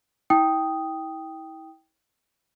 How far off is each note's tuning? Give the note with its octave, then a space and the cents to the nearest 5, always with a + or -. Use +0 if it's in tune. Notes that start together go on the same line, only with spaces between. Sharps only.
E4 -35 G5 +0 D#6 +0